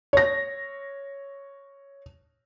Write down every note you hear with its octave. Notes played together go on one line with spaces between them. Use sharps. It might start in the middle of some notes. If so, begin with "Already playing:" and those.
C#5 A#6